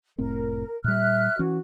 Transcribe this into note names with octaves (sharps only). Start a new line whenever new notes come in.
F1 A2 C4 A#4
A#2 G3 E5 F6 F#6
E3 C#4 F#4